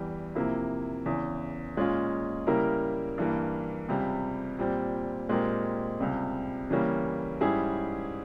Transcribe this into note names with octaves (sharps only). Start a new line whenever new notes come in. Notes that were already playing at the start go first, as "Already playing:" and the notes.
Already playing: E2 E3 G3
C3 F3 A#3 E4
E2 C#3 E3
A#2 G#3 C#4 F4
C#3 G3 A#3 E4 A#4
G2 E3 A#3
C#2 C3 G3
A#2 G3 C4
A#2 G#3 C4 G4 A#4
C#2 C3 G3
C#3 E3 G3 A#3 C#4
G#2 G3 C#4 E4 G#4